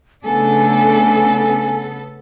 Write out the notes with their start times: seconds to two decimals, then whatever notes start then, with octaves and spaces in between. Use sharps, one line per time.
0.25 C#3 A3 B3 D4 A4 G#5